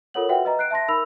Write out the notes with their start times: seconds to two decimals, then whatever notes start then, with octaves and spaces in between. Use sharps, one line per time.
0.14 F4 A4 A#4 C#5 F#5 F#7
0.29 F#4 B4 E5 F#5 G5
0.45 B4 D#5 A#5
0.59 F#6 C7 D7
0.70 E5 A5 C6 A#6
0.88 D#4 A#4 B5 E6 F7